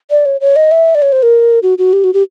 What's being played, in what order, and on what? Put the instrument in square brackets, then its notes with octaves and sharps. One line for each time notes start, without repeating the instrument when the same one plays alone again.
[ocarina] D5
C#5
C#5
D#5
E5
D5
C#5
C5
A#4
F#4
F#4
G4
F#4
G4